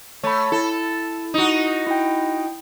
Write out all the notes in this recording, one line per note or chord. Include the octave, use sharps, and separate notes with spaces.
A3 C#5 B5
E4 A4
D#4 F#4
E4 G5